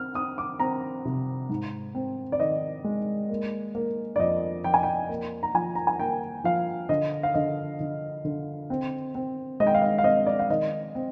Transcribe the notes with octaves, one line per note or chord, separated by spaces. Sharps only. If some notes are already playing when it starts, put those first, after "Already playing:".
Already playing: C4 F6
C4 D#6
D6
C4 A#5
C3
G#2
C4
D5
D#3 D#5
G#3
A#3
A#3
D5
F2 D#5
F2 G5
G#5
G5
A#3
A#5
F3 G#5
A#5
G#5
A#3 G5
F3 F5
D3 D#5
F5
D3 D#5
D3
D3
C4
C4
G#3 D#5
G5
F5
D#5
F5
C4 D#5
D5
F5
D#3 D#5
C4